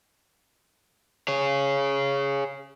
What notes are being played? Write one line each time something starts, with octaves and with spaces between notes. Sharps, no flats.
G#4 C#5